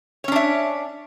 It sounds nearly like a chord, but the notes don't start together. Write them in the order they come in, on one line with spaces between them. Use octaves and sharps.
C#5 C#4 D4 E5